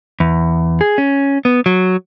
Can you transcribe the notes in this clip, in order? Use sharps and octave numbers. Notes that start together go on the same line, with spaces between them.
E2
G#4
C#4
B3
F#3